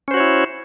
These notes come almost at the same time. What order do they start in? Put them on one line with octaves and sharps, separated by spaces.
C#4 C5 F#4 C#5 E4